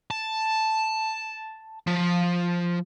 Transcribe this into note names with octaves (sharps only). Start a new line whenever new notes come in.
A5
F3